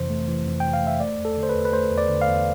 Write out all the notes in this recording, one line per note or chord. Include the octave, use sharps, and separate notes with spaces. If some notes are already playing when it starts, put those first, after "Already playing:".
Already playing: F2 C3 E3 C5
A3
E3
F2
C3 G5
F5
A3 E5
A3 D5
E2
A4
D3
C5
B4
E2
B4
A3 C5
E2
D5
D3
F5
E2